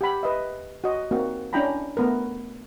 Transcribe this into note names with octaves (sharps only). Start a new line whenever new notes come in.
G4 F#5 B5
B4 D#5 E5
F#4 D#5
A#3 C4 D#4 F#4
C#4 D4 E4 G5 A#5 B5
A3 B3 A#4